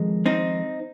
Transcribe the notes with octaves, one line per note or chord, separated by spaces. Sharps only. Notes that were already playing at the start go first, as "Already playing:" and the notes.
Already playing: F2 D#3 G#3
C4 D#4